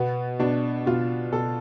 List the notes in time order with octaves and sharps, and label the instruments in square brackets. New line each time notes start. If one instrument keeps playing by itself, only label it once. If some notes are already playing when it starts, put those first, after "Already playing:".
Already playing: [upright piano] B2 B3
B2 D4
B2 F4
B2 A4